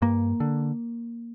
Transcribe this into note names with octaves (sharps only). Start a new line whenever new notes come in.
G2 A#3
D3